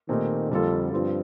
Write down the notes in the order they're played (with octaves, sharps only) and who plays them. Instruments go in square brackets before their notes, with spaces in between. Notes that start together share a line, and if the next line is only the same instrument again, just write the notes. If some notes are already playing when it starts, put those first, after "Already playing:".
[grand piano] A#2 A3 C4 D#4 G4 [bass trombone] D#3
[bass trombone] F2 [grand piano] D3 G3 A#3 F4 A4
[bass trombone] G2 [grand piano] F3 C4 F4